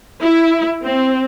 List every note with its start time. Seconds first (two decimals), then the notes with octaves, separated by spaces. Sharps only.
0.22 E4
0.81 C4